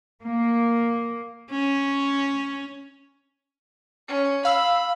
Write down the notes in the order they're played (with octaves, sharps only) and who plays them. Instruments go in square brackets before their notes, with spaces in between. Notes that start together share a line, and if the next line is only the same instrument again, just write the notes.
[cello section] A#3
[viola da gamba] C#4
[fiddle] C#4
[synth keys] F5 E6 [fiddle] B5